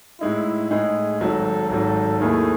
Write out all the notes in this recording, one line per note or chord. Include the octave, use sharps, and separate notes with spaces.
A2 G#3 D#4 E4
A2 G#3 D#4 G#4
G#1 G#2 F#3 A4
G#1 G#2 F#3 A4
D#2 D#3 A3 E4 G#4